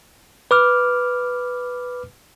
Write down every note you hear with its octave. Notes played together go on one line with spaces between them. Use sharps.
B4 D6 F6